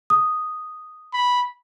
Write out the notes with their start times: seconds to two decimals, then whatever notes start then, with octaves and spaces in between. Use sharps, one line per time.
0.10 D#6
1.14 B5